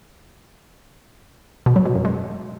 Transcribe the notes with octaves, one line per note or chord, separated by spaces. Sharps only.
B2
F#3
B2
F#2
G#3